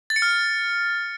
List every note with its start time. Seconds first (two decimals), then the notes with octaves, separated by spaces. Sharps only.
0.10 A6
0.16 C#7
0.22 F6